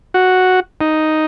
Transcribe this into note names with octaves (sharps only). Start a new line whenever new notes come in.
F#4
D#4